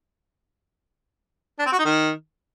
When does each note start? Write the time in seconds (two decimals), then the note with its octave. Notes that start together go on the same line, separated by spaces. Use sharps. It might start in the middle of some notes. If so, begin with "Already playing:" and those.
1.59 D4
1.66 C4
1.72 F#4
1.79 D#4
1.85 D#3